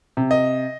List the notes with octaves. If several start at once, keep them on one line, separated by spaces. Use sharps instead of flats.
C3
D#5